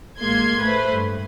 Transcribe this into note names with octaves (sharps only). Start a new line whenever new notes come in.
A1 G#3 A#3 C6 G#6
A3 B4 C5
G2